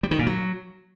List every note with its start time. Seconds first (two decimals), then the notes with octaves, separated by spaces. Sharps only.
0.03 G3
0.11 D#3
0.19 A#2
0.27 F#3